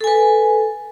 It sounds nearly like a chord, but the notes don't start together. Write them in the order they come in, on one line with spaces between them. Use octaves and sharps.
A4 G#5 B4